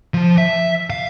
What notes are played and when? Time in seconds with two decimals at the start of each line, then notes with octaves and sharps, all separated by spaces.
0.14 F3
0.38 E5
0.90 F5